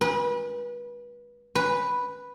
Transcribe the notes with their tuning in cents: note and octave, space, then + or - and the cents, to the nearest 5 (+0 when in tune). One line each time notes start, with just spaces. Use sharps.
B4 -30
B4 -5